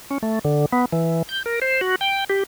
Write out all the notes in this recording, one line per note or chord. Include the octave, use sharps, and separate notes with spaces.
C#4
A3
D3
B3
E3
G6
A#4
C5
F#4
G5
G4